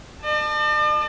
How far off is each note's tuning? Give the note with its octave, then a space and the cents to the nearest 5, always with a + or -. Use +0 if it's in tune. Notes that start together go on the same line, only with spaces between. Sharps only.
D5 +45 A5 +0